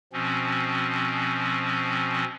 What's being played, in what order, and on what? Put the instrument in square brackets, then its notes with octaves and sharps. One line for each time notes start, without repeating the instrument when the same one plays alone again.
[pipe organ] B2 F3 C4 C#4